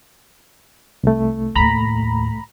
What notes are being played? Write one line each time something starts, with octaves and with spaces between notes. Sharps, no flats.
C2 A3
D#2 A2 A#5 B5